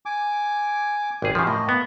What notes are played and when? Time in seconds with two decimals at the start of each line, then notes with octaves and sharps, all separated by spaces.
0.06 G#5 D6
1.22 G#1 G4 G#4
1.35 C#3 F3
1.47 A2 A#3 D#5
1.69 B3